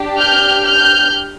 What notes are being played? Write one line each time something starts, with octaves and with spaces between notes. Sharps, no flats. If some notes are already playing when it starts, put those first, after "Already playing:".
Already playing: D4 G4
F6 G6
F6 G6